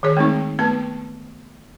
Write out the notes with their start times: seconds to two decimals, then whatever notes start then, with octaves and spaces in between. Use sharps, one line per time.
0.03 D#3 G#4 C#5
0.17 G#3 A3 C4 D#4
0.59 A3 B3 B4 A5